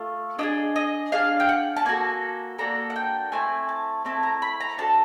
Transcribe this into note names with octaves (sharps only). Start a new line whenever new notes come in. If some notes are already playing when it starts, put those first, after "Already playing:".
Already playing: A3 F4
D4 F4 G#4 D#5
D#5
D4 F4 G#4 F5
G5
F#5
A5
A#3 D4 F#4 A4 G#5
A#3 D4 F#4 A4 A#5
F#5
G5
A3 C4 E4 G#5
A5
A3 C4 E4 A5
A#5
B5
A#5
D4 F#4 A4 A5